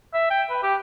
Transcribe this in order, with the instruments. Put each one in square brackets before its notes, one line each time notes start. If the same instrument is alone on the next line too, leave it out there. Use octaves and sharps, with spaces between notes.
[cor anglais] E5
G5
B4
G4